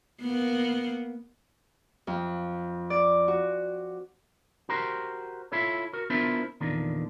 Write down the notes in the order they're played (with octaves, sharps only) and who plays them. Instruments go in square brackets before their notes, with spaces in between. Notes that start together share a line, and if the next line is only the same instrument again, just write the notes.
[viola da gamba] A#3 B3
[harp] F2
D5
F#4
[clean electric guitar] F#4 G4 A#4 C5
E4 F4 A4 C#5
F#4 A#4
B3 D4 E4 F4 A#4 C5
E2 A#2 D3 D#3